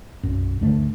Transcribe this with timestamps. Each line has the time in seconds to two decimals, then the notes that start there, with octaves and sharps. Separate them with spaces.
0.23 B1 F#2
0.61 D2 G2 D3 A3